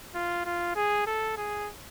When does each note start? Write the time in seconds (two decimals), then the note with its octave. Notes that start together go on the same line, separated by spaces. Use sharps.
0.15 F4
0.45 F4
0.76 G#4
1.07 A4
1.37 G#4